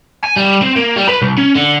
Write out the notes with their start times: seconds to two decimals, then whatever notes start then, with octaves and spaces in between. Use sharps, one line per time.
0.24 G#5
0.36 G3
0.62 C4
0.76 A#3
0.96 G3
1.09 B4
1.22 C2
1.38 C#4
1.55 D3